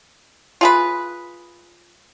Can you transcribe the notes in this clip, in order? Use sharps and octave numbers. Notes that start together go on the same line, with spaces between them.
F4 G#4 B4